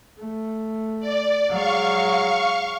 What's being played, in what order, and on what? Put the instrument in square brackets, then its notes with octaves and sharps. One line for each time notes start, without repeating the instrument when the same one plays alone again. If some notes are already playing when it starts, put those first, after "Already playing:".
[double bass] A3
[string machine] D5
[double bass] F#3 G#3 [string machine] F5 C#6